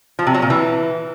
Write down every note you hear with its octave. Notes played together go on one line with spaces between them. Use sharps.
F3
C3
F#3
A#2
E3